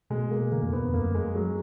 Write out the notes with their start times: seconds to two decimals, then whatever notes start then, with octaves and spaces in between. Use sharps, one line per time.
0.10 B2 G#3
0.31 A#3
0.52 D3 A#3
0.63 F2
0.73 B3
0.83 F2
0.94 F#2 A#3
1.15 G#3
1.35 F#3